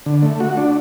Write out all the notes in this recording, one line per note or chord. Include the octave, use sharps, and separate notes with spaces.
D3
A3
F#4
D4